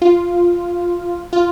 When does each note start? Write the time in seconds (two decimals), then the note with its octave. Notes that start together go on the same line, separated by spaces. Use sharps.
0.02 F4
1.33 F4